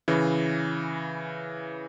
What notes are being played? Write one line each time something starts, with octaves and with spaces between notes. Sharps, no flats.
C#3 E3